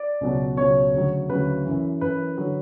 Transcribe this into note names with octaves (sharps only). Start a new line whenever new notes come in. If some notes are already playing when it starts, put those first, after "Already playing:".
Already playing: D5
C#2 B2 F#3
C#2 B2 F#3 C#5
D2 C#3 F#3
D2 C#3 F#3 B4
F#2 E3
F#2 E3 B4
D3 F#3